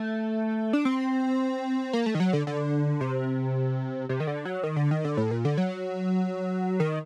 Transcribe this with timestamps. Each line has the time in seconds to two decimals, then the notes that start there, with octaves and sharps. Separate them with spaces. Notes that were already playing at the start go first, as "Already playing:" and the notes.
Already playing: A3
0.73 D4
0.85 C4
1.93 A#3
2.06 A3
2.15 D#3
2.20 F#3
2.33 D3
2.47 D3
3.01 C3
4.09 C3
4.20 D#3
4.27 D3
4.45 F#3
4.63 D#3
4.76 D3
4.91 D#3
5.05 D3
5.17 A2
5.31 A#2
5.45 D3
5.58 F#3
6.80 D#3